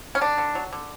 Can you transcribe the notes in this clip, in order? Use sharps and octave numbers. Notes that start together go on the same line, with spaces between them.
C#4
D3 D4
D3
F#3
D3